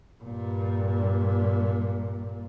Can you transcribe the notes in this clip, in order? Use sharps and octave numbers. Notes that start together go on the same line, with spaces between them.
G2 A#2